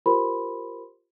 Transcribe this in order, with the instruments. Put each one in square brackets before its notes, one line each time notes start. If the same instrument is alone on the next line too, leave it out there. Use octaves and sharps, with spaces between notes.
[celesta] F4 G4 A#4 C5 B5 C6